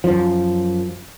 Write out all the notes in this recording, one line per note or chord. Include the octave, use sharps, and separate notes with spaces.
F#2 F3